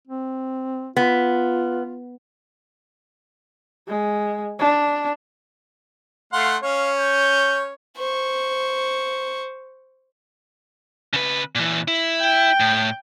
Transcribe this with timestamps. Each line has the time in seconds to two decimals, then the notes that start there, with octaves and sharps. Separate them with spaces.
0.08 C4
0.97 B3 F4
3.87 G#3
4.59 D4
6.33 A3 F5 F#5 C6
6.63 C#4 C#5 F5
6.98 G6
7.97 C5 C#6
11.13 C#3 B4
11.55 A#2 E3
11.88 E4
12.21 G5
12.60 A2